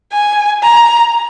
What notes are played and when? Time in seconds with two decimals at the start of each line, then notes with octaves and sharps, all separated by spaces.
0.13 G#5
0.63 A#5